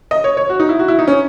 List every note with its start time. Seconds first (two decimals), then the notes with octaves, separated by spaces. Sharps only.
0.11 D#5
0.24 C#5
0.37 C#5
0.49 F#4
0.60 D#4
0.69 E4
0.79 F#4
0.88 E4
0.99 D#4
1.07 C#4